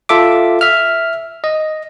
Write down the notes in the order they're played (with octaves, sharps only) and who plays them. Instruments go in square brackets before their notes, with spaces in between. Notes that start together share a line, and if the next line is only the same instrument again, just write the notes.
[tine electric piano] F4 A4 E5 D6
E5 F6
D#5